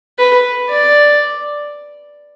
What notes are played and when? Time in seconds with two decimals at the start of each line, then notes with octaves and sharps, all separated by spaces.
0.19 B4
0.69 D5